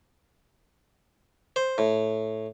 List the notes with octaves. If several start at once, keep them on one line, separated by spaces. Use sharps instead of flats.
C5
A2